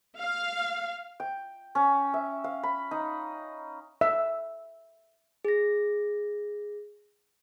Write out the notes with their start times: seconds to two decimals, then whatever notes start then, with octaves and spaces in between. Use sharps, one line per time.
0.19 F5
1.20 G5
1.75 C#4
2.14 E5
2.44 F5
2.63 B5
2.91 D#4
4.01 E5
5.45 G#4 A#6